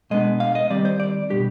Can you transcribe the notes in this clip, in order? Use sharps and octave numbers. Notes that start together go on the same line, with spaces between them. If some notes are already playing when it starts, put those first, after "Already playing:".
B2 G#3 B3 D4 D#5
F5
D#5
D#3 G3 C4 D5
C5
D5
B2 G3 D4 G4